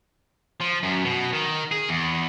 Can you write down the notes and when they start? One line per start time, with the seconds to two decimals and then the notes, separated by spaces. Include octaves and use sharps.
0.61 F3
0.83 F#2
1.05 B2
1.33 D#3
1.72 G#4
1.89 E2